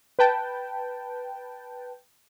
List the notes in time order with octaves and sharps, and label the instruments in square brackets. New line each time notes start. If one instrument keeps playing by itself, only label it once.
[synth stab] B4 G5 A5